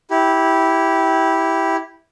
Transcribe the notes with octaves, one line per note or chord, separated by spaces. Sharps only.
E4 G4